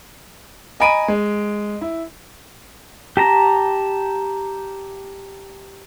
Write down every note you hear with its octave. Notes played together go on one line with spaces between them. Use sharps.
D#5 G#5 A#5 B5 D7 D#7
G#3
E4
G4 A5 A#5